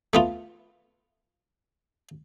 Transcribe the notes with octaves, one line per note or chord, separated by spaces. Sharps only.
A3 B3 F4